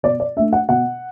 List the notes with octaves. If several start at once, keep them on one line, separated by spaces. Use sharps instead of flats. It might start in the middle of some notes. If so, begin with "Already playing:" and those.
B2 D5
D5
A3 D4 E5
F#5
B2 F#5